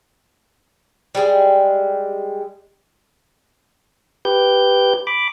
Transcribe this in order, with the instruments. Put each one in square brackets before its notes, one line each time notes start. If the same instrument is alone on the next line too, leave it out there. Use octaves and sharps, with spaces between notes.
[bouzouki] G3 G#3
[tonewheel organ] G4 B4 G6
B5 D6